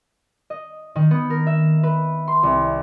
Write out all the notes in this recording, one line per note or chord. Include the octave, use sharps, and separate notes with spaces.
D#5
D#3
B3
A#4
E5
B4
C6
C2